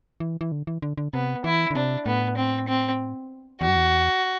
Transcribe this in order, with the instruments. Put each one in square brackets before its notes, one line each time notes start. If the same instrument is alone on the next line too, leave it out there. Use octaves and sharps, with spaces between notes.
[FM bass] E3
E3
D3
E3
D3
D3
[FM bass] C3 [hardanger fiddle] B3
[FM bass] E3 [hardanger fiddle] E4
[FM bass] D3
[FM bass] C3 [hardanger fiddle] D4
[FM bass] A2 [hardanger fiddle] B3
[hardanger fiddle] C4
C4
[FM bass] E2 [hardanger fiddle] F#4
[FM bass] F#2
E2